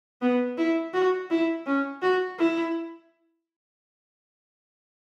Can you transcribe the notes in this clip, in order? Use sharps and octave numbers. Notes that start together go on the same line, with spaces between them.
B3
E4
F#4
E4
C#4
F#4
E4